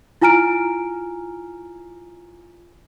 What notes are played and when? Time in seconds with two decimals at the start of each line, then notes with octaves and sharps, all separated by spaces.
0.22 E4 F4 G#5 A#5 F6 D7